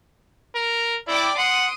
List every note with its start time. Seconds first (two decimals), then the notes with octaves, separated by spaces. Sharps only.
0.55 A#4
1.07 E4 D5 G5 D6
1.38 F#5 C6 D#6 D7